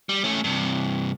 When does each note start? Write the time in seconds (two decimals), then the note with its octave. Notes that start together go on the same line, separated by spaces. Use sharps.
0.09 G3
0.24 A3 C#4
0.44 G2 C3